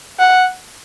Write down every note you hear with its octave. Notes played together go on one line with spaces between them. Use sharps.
F#5